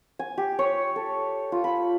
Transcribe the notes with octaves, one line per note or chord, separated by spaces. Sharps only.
G#5
G4
C#5
A4
F4
B5